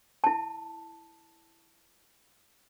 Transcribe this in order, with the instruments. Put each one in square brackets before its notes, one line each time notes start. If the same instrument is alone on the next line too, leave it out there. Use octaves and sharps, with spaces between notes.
[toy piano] E4 A5